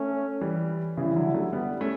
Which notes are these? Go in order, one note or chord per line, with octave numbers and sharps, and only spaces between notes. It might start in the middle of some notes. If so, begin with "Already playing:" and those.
Already playing: A3 C#4
E3 G3
C#3 E3 G3 C#4 E4
D3 F#3
F#3 A3
G3 B3
A3 C#4